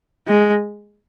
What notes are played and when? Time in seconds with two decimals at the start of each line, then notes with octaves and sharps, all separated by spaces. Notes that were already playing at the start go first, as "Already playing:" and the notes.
0.27 G#3